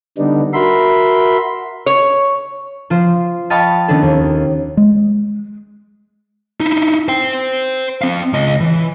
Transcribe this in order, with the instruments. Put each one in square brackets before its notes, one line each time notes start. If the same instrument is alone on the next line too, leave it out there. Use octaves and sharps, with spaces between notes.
[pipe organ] D3 G3 B3 D4 D#4
F#4 A#4 E5 B5 C6
[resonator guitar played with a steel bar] C#5
[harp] F3 F4 C5
D#5 F5 G5 A5 B5 C#6
D#3 B3 C#4 D4 A4
D#2
[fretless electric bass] G#3
[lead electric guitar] D#4 E4
C5 G5
C4 F5
C#2 D#5
E3